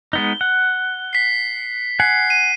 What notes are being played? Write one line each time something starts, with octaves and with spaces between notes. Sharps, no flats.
G#3 B3 D#4 G7
F#5
B6 C7
F#5 G#5 C7
D#7